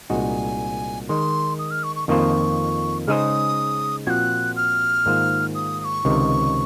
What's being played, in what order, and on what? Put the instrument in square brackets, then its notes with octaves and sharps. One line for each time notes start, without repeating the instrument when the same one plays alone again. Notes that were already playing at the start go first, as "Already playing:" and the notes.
[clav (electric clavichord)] C2 A#2 G#3 D#4 F#4 [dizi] G#5
[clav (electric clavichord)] D#3 G#3 D#4 [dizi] C6
[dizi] D#6
F6
C#6
C#6
[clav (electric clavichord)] F2 D#3 A#3 F4 C5 [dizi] C#6
[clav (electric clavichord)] C#3 G#3 D#4 G#4 C5 [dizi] D#6 F6
[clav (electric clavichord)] A#2 F3 C4 F#4 [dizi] F#6 G#6
[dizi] F6
[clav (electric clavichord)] G#2 D#3 A#3 F4 C5
[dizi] D#6
D#6
C#6
[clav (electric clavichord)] C#2 C3 D#3